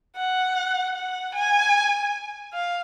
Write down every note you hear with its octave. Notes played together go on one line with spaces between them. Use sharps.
F#5
F#5
G#5
F5